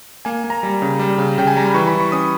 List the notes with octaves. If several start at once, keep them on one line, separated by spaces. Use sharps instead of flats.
A#3 G#5
A#3
A#5
G3
C#3
G3
C#3
C#3 G5
G#5
G3 A#5
B5
E3 C#6
B5
E3
C#6
C#4 D#6